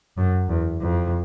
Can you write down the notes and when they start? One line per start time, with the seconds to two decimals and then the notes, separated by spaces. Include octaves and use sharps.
0.17 F#2
0.49 E2
0.81 F2